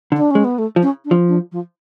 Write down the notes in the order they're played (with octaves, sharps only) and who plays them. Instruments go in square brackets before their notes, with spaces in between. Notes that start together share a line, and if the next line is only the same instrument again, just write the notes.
[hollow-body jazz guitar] D3
[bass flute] D4
[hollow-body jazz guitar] G#3 [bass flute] C#4
[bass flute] B3
A3
[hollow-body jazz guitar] F3
[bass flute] C#4
D4
[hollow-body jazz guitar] F3
[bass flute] D4
F3